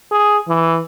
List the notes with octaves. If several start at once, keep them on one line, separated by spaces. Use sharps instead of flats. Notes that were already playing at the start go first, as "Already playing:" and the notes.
G#4
E3